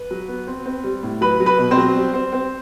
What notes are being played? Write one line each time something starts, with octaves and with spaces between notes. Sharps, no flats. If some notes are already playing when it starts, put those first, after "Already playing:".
Already playing: B4
F#3
B3
C4
C4
G3
A2
F#3 B4 B5
F#3
B4 B5
B2
C4 C5
F#3
G3
C4
C4